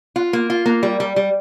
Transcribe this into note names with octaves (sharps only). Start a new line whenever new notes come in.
F4
A#3
F4
A#3
G3
G3
G3